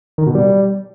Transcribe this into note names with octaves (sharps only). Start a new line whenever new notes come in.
D#3
B2
G3